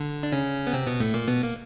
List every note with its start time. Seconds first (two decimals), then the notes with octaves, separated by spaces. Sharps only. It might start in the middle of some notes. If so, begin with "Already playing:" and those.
Already playing: D3
0.23 D4
0.32 C#3 C#4
0.67 B3
0.73 C3 C4
0.87 B2 B3
1.00 A2 A3
1.14 A#2 A#3
1.28 B2 B3
1.43 A#3